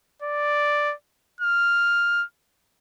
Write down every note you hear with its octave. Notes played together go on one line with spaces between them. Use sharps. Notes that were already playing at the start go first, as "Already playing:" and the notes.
D5
F6